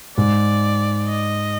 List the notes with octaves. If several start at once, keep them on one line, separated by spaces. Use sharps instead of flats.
G#2 D5
D#5